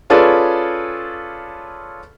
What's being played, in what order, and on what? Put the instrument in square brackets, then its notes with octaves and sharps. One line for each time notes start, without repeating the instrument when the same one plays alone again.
[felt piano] C#4 F4 G#4 A4 B4 D5